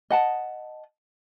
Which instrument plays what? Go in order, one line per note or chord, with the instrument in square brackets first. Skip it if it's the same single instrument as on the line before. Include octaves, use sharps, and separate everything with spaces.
[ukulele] D#5 F#5 A5